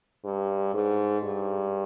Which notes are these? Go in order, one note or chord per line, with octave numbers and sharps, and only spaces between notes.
G2
G#2
G2